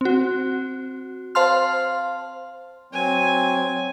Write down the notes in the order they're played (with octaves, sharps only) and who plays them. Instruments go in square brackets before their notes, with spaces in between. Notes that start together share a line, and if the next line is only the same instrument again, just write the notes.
[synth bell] C4 F#4
C5 F5 A5 C6 F6
[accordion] F#3 C4 [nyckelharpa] G#5